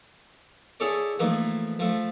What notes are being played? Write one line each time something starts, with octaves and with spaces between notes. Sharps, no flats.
E4 G#4 A4 C#5 D5
E3 F3 A3 A#3 D#4
F3 A3